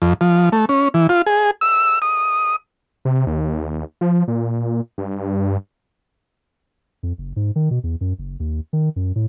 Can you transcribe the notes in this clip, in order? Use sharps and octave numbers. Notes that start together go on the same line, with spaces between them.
F2
F3
A3
C#4
E3
F4
G#4
E6
D#6
C3
D#2
F3
A#2
G2
F2
F#1
G#2
D#3
B2
E2
F#2
F#1
D#2
D#3
F#2
A2